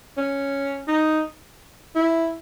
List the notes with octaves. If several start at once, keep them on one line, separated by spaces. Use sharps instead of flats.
C#4
D#4
E4